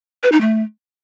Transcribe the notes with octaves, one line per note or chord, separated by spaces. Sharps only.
B4
D#4
A3